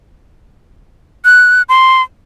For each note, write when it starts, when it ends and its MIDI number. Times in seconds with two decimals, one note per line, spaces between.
1.25 1.62 90
1.69 2.02 84